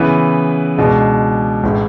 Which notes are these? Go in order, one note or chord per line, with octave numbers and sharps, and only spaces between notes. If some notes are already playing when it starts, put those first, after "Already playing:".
Already playing: C#3 E3 B3 E4 B4
C#2 B2 G#3 D4
A1 A2 G#3